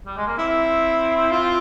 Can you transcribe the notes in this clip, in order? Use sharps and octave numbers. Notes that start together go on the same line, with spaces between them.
G3
G#3
A#3
C4 E4
F4